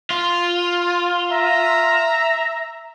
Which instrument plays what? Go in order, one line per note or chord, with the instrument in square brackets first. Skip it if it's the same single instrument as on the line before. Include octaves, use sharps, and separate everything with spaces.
[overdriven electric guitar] F4
[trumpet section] E5 A#5